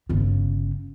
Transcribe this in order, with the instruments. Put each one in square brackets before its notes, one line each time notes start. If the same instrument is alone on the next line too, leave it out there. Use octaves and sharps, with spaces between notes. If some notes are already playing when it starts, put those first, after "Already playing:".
[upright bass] G1 C#3